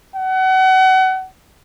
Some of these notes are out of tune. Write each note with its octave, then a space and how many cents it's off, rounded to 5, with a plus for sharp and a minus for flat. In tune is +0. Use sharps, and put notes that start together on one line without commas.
F#5 +30